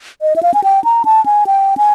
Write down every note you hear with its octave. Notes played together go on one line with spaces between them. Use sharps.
D#5
E5
F5
G#5
G5
A#5
A5
G#5
G5
G#5